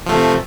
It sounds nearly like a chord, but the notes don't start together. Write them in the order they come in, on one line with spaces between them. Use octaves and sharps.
F3 A3 C3